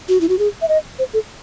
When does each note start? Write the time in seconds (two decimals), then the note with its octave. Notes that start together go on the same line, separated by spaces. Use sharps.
0.09 F#4
0.21 E4
0.29 F#4
0.39 G#4
0.62 E5
0.69 D#5
0.99 C5
1.14 A4